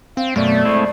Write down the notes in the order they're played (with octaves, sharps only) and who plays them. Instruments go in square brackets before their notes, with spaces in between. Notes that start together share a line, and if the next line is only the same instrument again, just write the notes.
[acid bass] C4 [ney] F5
[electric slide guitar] F#2 B2 [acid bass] A3 [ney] D5
[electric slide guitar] G#3 C4 E4